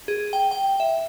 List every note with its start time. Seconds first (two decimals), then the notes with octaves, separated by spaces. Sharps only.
0.08 G#4
0.33 G5
0.51 G5
0.80 E5